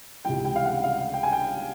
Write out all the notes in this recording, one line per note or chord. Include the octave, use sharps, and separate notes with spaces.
C#2 C3 E3 G5
G5
F5
F#5
F5
G5
G#5
G5